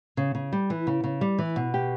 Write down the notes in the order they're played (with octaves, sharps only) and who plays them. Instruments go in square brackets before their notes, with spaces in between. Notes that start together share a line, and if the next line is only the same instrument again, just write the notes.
[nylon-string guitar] C#3
C#3
G3
E3
C#3
C#3
G3
E3
B2
G4